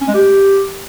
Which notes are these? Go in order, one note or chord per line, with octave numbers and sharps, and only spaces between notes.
C#4
G#3
G4